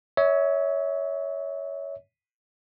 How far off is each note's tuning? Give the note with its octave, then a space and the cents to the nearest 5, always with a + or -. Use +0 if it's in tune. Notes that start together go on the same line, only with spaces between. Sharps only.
C#5 +15 E5 -30